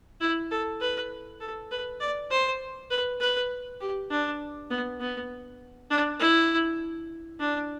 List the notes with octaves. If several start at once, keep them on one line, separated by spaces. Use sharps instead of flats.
E4
A4
B4
A4
B4
D5
C5
B4
B4
G4
D4
B3
B3
D4
E4
D4